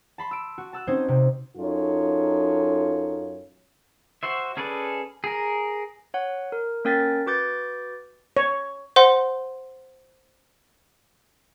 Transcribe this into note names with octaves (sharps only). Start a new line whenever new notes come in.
A5 B5 C6
E6 D7
F#4
A5 E6 F#6
C4 C#4 D#4 C5 C6 G#6
C3
F#2 D#4 F4 A4 C#5
F#4 C5 E5
C#4 G#4 A4 B4 D5
G#4 A#4
C#5 F#5
A#4
A#3 C#4 A#4 G5 A6 B6
F#4 B4 D6 G6 A6
C#5
C5 F#5 C6